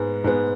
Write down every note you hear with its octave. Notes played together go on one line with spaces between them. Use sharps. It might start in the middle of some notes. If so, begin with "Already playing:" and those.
Already playing: G#2 G#3 B3
G#2 G#3 B3